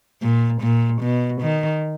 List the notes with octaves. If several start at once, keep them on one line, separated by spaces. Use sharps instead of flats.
A#2
A#2
B2
D#3